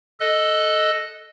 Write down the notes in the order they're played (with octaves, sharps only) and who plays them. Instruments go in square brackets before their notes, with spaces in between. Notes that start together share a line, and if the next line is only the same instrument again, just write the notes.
[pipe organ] A4 D#5 F#6